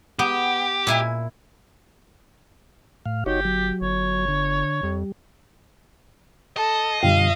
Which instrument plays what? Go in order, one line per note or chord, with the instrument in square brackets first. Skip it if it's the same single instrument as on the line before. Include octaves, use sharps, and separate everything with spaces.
[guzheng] B3 [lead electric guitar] G4
[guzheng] A#2 E4 G#5
[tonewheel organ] A2 F5
[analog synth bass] G1 [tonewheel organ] D#4 F#4 C#5 [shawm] G4
[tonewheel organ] F#3
[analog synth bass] G1 [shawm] C#5
[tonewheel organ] D3
[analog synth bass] F2 [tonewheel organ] G3
[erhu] A4 [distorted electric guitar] D#5
[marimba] F#2 [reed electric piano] B2 D3 G3 [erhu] F5